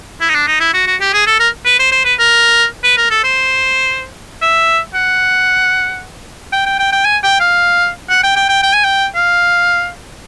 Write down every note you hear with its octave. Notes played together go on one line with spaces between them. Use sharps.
E4
D#4
D4
D#4
E4
F#4
F#4
G4
G#4
A4
A#4
B4
C5
C5
B4
A#4
B4
A#4
A4
C5
E5
F#5
G5
G5
G5
G5
G#5
G5
F5
F#5
G5
G5
G5
G5
G#5
G5
F5